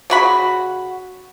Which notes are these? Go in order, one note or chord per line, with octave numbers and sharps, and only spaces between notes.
C#3 F#4 B5